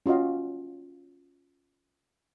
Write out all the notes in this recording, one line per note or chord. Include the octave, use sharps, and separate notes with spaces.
C#4 F4 F#4 D#5 F5